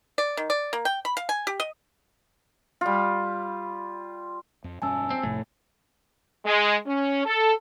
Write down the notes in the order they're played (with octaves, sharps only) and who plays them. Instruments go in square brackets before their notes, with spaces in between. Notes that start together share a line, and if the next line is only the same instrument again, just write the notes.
[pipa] D5
D#3
D5
A#3
G5
B5
F5
G#5
G4
D#5
[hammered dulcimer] G3 F4
[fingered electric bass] F2
[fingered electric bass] E1 G2 C#4 [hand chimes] G#5 A5 E6
[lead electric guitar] C4
[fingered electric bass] C2 F2 C3 [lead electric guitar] A2
[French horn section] G#3
C#4
A4